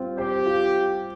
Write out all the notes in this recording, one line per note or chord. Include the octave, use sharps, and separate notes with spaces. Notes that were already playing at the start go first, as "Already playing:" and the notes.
Already playing: G3 C4 F4
G4 C5
F4